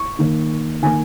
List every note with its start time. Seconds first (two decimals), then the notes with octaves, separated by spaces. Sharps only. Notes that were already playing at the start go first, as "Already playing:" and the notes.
Already playing: C#6
0.19 D#3 A#3
0.82 D#3 A#3 G#5